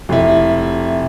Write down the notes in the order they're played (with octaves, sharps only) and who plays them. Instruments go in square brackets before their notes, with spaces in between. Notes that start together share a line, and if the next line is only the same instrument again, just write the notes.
[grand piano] F1 E4